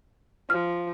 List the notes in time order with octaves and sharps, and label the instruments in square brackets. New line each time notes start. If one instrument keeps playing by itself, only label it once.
[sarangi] F3 [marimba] F6